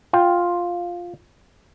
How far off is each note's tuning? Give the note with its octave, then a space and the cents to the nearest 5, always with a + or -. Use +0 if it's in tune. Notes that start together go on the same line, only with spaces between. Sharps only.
F4 +5 G5 +5